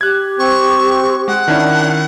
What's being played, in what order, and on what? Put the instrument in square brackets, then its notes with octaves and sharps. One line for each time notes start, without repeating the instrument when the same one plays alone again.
[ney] G4 [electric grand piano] F#6 G#6
[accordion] C4 [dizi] C#6
[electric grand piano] G#3 [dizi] F#5
[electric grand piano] D#3 C#4 E4 [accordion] D4